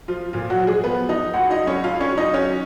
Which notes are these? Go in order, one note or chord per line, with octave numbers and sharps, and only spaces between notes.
F3 F4
A#2 F3 F4
F#3 F#4
F3
G#3 G#4
F3 B3 B4
F3 D#4 D#5
C#2 F#4 F#5
D#4 D#5
F#3
C#4 C#5
C#2 F4 F5
C#4 C#5
F#3
D#4 D#5
F#3 C#4 C#5